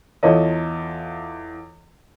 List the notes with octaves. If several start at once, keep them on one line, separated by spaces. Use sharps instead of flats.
E2 F4 A4 C#5 D#5